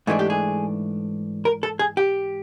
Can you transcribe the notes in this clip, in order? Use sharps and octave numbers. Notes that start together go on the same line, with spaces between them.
G#2 E3 A3 D4 G#4
G4
G#4
A#4
A4
G#4
G4